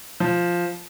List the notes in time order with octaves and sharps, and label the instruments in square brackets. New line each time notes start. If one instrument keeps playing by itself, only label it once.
[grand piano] F3